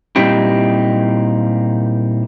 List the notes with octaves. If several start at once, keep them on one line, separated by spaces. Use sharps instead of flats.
A#2 G3 C4 D#4 E4 G4